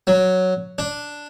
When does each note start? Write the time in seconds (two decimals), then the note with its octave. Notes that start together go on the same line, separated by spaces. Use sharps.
0.07 F#3
0.78 D4